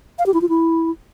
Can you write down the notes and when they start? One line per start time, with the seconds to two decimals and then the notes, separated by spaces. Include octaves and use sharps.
0.19 F5
0.26 G4
0.34 E4
0.42 F4
0.49 E4